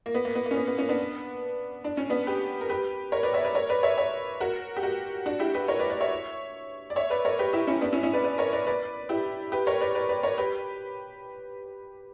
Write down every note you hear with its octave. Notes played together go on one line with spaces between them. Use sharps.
A#3
B3
A#3
B3
A#3
C#4
B3
B3
A#3 C#4
B3 D4
D4
C#4
B3 D4
G4 B4
A#4
G4 B4
A#4 C#5
B4 D5
C#5 E5
B4 D5
A#4 C#5
B4 D5
C#5 E5
C#5 E5
F#4 A#4
G4
F#4 A#4
D4 F#4
E4 G4
G4 B4
A#4 C#5
B4 D5
B4 D5
C#5 E5
D5
C#5 E5
B4 D5
A#4 C#5
G4 B4
E4 G4
C#4 E4
B3 D4
C#4 E4
C#4 E4
B4 D5
B4 D5
A#4 C#5
B4 D5
B4 D5
E4 G4
G4 B4
A#4 C#5
B4 D5
B4 D5
B4 D5
A#4 C#5
G4 B4